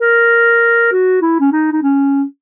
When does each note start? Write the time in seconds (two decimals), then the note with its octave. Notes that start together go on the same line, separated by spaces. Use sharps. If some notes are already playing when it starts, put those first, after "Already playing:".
0.01 A#4
0.92 F#4
1.22 E4
1.40 C#4
1.52 D#4
1.73 D#4
1.82 C#4